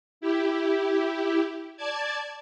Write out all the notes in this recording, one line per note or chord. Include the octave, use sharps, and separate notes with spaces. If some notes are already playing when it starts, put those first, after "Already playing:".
E4 G4
D5 A5 G#6